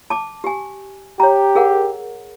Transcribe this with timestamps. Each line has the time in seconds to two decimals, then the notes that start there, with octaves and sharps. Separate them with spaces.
0.10 A5 D6
0.44 G4 G#5
1.20 G4 C#5 A#5
1.55 G#4 A#4 F#5